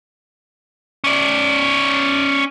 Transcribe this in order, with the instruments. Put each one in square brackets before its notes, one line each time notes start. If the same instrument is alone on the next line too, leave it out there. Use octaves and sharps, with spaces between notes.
[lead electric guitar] C#4 D5